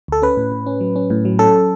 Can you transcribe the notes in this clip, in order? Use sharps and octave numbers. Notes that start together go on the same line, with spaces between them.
D2 A4
C#4 B4
A2
A2
C#4
F#3
C#4
A2
F#3
C#4 A4